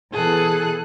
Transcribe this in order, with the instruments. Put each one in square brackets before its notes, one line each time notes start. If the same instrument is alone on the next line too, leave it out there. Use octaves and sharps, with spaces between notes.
[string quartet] B2 E3 G#4 A4 F#6